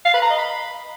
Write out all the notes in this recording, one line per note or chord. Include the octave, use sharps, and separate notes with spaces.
F5
B4
A#5
D#5
B5